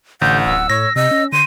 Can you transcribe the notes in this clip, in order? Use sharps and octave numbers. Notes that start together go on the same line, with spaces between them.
A1 D3 F#5 G6
D1 E6
A2 C#5 A#6
C3 D#5 E6
C#4
D3 C6 D#7